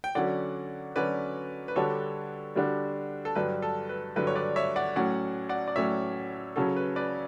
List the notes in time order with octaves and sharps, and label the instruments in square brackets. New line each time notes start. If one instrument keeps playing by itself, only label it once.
[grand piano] G5
[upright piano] D3 F#3 C#4 F#4 [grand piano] D5 F#5
[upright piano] D3 F#3 C#4 F#4 [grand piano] B4 D5
[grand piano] B4
[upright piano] D3 G3 D4 F#4 [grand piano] A4 C#5
[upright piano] D3 G3 D4 F#4
[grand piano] A4
[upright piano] G2 D3 F#3 [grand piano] B4
[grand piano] A4
B4
[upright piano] G2 D3 F#3 [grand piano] B4
[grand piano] C#5
B4 D5
C#5 E5
D5 F#5
[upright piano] A2 F#3 C#4 [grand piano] D5 F#5
[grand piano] D5 F#5
D5
[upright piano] A2 F#3 C#4 [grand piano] C#5 E5
[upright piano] C#3 F#3 C#4 F#4 [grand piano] A4
[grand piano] B4
B4 D5